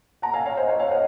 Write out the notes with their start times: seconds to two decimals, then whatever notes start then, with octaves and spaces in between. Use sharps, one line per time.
0.22 F#5 A#5
0.34 F5 G#5
0.46 C#5 F5
0.57 C5 D#5
0.69 C#5 F5
0.79 C#5 F5
0.91 D#5 F#5